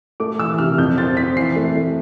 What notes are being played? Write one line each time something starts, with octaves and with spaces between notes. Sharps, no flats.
A3 D6
E3 E6
C3 F6
F2 G6
C4 A6
C4 B6
E3 C7
A3
A3